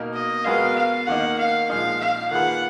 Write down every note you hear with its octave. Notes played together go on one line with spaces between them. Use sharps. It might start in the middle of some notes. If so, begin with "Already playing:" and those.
Already playing: B2 A#3 D#4 A#4
D#5
G#3 B3 F#4 A#4 F5
F5
D#3 A#3 D#4 F#5
F5
A#2 F3 G#3 D#4 F5
F5
D#3 A#3 F4 G#4 B4 F#5